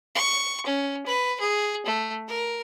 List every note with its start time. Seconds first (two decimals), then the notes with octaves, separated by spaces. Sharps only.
0.15 C#6
0.66 C#4
1.06 B4
1.40 G#4
1.86 A3
2.28 A#4